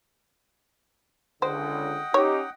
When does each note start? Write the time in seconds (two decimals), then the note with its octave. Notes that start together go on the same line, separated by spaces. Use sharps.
1.42 C#2 D3 C5 D#5 F#5 G5
2.14 C#4 D#4 G4 C#5